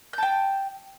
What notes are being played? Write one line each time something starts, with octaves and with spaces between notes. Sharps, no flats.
G5 A5 G6